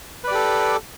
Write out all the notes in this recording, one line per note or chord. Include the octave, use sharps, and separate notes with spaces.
G4 A4 B4 D5